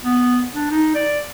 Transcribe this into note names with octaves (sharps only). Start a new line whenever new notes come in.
B3
D4
D#4
D5